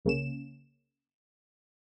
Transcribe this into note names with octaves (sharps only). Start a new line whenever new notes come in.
C2 C#3 A#3 C#4 E7